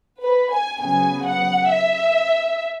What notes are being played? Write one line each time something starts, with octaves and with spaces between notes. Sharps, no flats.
B4
G#5
C#3 F#3 B3 G#5
F#5
E5